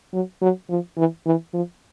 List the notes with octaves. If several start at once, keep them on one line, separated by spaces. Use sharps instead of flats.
F#3
F#3
F3
E3
E3
F3